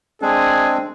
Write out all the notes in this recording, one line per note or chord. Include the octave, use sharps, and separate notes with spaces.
G#3 C4 D4 G#4